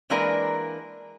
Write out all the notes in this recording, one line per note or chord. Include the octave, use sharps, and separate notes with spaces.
E3 G#3 A#3 D4 A#4 B4